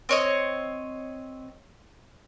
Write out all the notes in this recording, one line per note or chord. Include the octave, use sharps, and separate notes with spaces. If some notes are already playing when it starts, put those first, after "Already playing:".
C4 C#5 D#5